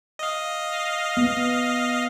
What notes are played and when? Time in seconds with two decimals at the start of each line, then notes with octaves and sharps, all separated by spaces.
0.19 D#5 F5
1.17 B3